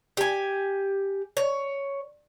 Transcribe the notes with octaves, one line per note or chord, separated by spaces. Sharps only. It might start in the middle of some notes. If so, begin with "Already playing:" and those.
G4 G#5
C#5